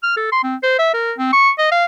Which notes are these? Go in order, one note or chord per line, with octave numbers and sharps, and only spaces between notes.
F6
A4
C6
C4
C5
E5
A#4
C4
C#6
D#5
F5